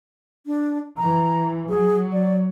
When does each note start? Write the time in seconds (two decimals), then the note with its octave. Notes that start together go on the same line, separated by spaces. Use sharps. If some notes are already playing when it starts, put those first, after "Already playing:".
0.46 D4
0.97 E3 A#5
1.69 F#3 G#4
2.13 D5